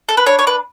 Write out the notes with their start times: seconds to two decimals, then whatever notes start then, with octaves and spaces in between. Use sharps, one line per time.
0.09 A4
0.17 B4
0.26 D4 C#5
0.39 C#5
0.47 B4